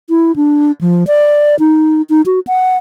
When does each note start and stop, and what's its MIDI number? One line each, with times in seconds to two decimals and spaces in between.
0.10 0.35 64
0.36 0.72 62
0.81 1.04 53
1.07 1.56 74
1.59 2.02 63
2.10 2.22 63
2.26 2.40 66
2.47 2.77 78